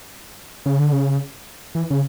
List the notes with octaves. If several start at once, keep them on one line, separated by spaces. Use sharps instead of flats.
C#3
D3
C#3
E3
C#3